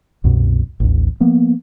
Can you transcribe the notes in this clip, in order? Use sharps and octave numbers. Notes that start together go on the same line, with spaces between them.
C2 F#2 B2
A1 D#2
F3 A#3 B3